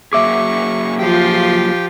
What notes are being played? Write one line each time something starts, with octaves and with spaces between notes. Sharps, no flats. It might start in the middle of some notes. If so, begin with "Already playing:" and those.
F#3 A#3 G#4 E5 C#6 D6
F3 F4 G4 G5